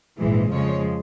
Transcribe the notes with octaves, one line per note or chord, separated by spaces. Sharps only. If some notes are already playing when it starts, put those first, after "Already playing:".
A#1 G#2 E3 G#3
F2 C#3 F3 G#3 C#5